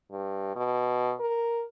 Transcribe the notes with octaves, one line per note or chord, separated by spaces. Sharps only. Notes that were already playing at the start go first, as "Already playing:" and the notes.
G2
B2
A#4